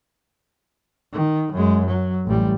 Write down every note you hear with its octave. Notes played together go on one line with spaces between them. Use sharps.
D#3
F#2 G#3
F#3
A1 G3